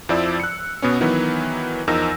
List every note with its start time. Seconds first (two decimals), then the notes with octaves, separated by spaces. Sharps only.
0.09 F2 F3 E4 D5 E6
0.40 F#6 C#7
0.82 B2 B3 C#4
1.01 D#3 E3 F#3 B3
1.87 E2 F3 D#4 A#4 E6 A#6